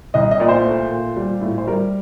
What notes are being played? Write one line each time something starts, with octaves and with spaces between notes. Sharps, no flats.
C2 D#5
D#5
A#2 D5
C5
A3
A#2
G3
A2
C5
G3 A#4